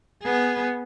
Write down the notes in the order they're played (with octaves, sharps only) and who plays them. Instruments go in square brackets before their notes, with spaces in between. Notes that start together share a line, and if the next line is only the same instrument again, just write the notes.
[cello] B3 G#4